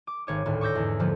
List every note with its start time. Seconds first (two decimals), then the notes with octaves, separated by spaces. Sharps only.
0.07 D6
0.27 G#1 C#5 D6
0.46 G#1 D2 A2
0.61 C#6 D6 E6 G6 A#6
0.75 E2 G#2
0.99 F2 D3 F3 G3 A#3